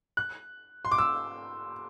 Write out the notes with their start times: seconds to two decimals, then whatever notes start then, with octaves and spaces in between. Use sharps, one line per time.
0.17 F#6
0.85 C6
0.92 D6
0.98 E6